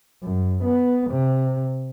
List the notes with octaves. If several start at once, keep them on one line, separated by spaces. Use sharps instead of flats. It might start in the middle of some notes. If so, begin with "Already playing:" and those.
F#2
B3
C3